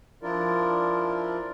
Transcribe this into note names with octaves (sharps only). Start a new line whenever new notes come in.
F3 D4 E4 F4 A#4 D5